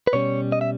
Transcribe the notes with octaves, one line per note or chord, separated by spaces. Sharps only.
B4
B2 G3 C#4 C#5
D#5
E5